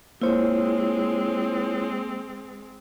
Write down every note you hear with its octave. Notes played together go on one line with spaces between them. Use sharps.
G#3 A#3 C4 E4 F4 C5 C#5